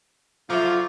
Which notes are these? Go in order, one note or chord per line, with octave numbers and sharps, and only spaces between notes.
D3 F3 F#3 F4 E5 D6